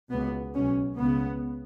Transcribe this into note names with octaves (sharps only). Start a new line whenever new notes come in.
C#2 B2 B3
B1 B2 C#4
C#2 C#3 B3